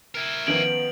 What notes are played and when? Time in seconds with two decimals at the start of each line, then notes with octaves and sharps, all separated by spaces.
0.15 E4 A#4
0.47 D#3 F3 B3 C#4 D7 F7 F#7